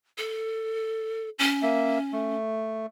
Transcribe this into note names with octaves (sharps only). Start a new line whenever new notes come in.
A4
C#4
A#3 E5
A3